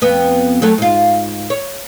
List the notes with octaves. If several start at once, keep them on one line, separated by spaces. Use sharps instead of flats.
F2 B3
F#3 A3 A4
G#2 F4
C#5